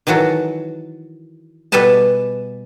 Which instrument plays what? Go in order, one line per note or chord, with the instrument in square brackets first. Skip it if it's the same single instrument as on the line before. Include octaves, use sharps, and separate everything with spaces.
[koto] D#3 E3 F#3 F#4 A4
B2 G3 A4 B4 G#5 A5